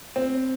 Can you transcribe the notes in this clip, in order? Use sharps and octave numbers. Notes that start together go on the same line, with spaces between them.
C4